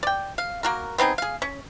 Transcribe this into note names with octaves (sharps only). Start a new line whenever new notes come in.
D5 G5
F5
A#3 F#4 A#4
B3 C4 D#4 G#4
G#4 F5
C#4